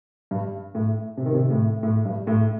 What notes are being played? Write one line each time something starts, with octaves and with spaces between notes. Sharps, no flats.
G2
A2
C3
D#3
C3
A2
A2
G2
A2